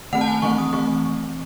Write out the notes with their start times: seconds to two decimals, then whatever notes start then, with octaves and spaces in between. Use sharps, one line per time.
0.13 D#3 A3 C4 F#5
0.21 A5
0.28 G#5
0.42 E3 A3 C4 C#6
0.58 D#6
0.73 E3 A3 C4 C#6